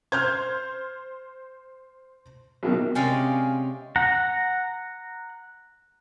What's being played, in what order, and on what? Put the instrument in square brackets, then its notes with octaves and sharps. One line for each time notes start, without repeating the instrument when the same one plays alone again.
[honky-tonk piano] C5 [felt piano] F6 G6 G#6
[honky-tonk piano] C2 [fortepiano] B2 D#3 F#3
[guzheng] C3 G#3 C#4 D5 F5
[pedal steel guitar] F#5 A#5